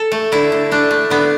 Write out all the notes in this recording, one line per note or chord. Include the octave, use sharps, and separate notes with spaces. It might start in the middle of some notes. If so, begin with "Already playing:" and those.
Already playing: A4
A3
D3 E4
D3
A3 D4
A3
D3 B3